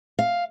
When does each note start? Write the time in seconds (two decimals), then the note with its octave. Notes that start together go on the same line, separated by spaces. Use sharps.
0.19 F5